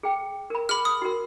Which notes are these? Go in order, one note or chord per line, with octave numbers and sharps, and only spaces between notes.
G#4 G5
A#4 B5
G#4 B5 F6
D#6
F#4 A#4